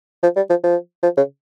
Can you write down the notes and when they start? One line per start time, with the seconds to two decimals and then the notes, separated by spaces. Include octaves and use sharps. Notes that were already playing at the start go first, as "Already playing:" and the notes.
0.23 F3
0.36 G3
0.50 F3
0.64 F3
1.03 F3
1.17 C#3